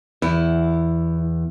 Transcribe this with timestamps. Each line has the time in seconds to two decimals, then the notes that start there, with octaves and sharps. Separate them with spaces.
0.22 E2 E4